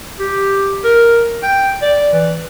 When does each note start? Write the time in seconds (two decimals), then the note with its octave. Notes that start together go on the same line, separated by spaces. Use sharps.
0.19 G4
0.84 A#4
1.43 G5
1.82 D5
2.13 E3